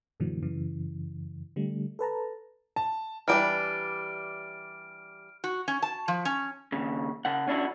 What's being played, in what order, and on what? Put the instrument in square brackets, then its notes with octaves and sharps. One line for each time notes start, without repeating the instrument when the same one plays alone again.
[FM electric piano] F#2 A#2 D3 E3 F#3
F#2 C#3 E3
D3 G3 A3
A4 B4 A5 A#5
[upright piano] A5
[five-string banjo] E3 G3 D4 [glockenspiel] F6 D7
[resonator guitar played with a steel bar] F#4
C#4
A5
F3
C#4
[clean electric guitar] D#2 C#3
C#3 F#5
C#4 D4 E4 F#4